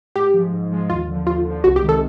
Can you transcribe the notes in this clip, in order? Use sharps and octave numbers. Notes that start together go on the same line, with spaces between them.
G#2 G4
F3 G#3
G#2
F3 G#3
D#2 F4
D3 F3
D#2 F4
D3 F3
C2 F#4
G4
C3 D#3 G#3
A4